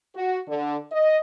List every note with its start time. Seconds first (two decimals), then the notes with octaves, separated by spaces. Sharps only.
0.15 F#4
0.47 D3
0.91 D#5